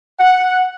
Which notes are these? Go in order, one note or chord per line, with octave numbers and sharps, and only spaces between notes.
F#5